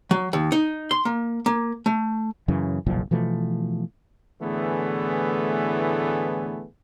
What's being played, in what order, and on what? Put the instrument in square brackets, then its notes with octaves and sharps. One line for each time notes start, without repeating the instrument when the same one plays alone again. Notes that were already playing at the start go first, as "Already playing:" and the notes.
[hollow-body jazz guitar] F#3
D#2
D#4
C6
A#3
A#3
A3
[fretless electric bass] F#2 C#3 E3
F#1 B1 A#2 F3
B2 E3 F3 A3
[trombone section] A2 D3 E3 A3 B3 G#4